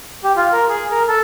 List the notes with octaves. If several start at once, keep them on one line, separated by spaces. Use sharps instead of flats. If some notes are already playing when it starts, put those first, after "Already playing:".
G4
F4
A#4
G#4
A#4
A4